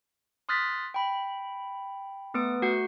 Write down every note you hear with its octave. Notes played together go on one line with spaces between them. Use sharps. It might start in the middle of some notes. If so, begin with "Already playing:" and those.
C6 D#6 F6 F#6 A6 B6
G5 B5
A3 B3 B4 D#6 D7
A3 F#4 F#5 G6